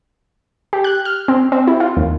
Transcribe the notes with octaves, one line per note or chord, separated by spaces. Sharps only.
G4
F#6
F6
C4
C4
E4
F4
D#2